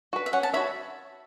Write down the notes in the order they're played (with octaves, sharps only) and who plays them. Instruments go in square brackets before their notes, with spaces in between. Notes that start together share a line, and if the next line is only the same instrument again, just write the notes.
[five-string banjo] F#4 B4
[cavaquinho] E5
[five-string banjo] C#4 [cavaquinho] F#5
[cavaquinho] A5
[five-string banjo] F#4 C#5 E5 [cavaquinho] B5